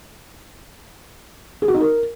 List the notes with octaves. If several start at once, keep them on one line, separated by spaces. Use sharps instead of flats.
G#4
F#4
D#4
A#4